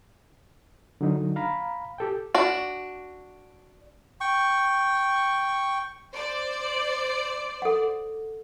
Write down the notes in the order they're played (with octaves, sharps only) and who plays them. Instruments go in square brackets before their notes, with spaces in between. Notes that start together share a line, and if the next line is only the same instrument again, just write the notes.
[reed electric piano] D3 F#3 D#4
F5 A#5 B5
G4 A4 G5
[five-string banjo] D4 F#4
[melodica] G5 C#6
[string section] C5 D5
[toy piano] A4 F#5